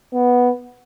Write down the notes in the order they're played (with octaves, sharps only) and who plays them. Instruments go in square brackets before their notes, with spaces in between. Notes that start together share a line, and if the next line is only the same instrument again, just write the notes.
[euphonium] B3